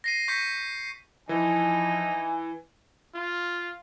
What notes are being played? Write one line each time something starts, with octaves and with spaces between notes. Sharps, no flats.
A#6 C7 D#7
C#6 G6 B6 C#7
E3 F3 D#4 G#5
F4